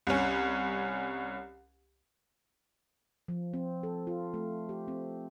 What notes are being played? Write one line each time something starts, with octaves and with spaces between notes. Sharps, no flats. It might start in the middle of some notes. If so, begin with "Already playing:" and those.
C2 C#4
F3
C4
A4
F4
A3
G4
C4